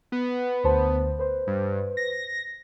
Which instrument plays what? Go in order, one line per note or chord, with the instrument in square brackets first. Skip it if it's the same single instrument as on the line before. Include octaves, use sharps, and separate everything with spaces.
[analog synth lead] B3
[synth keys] D2 C5 A5
B4 C5
[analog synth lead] G2
A#6